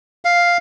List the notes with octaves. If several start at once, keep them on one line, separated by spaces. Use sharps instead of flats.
F5